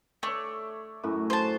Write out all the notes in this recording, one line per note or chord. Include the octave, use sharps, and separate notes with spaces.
A3 C#5 D5
F#2 A2 F#4
C5 A5